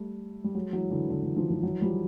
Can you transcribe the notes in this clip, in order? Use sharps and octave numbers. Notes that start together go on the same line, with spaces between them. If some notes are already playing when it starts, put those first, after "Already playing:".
Already playing: G3 A3
G3
F#3 G#3
E3 F#3
D3 E3
D3 E3
D3 E3
D#3 F3
D#3 F3
E3 F#3
F3 G3